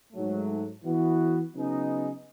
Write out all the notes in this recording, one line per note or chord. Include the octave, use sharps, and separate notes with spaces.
G#2 F#3 A3
E3 B3 F#4
C#3 F#3 B3 D#4 G#4